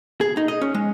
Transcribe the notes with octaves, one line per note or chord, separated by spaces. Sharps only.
G#4
D#4
D#5
C#4
G#3